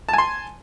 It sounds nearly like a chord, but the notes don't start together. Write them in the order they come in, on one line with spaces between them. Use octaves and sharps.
A5 G#5 C6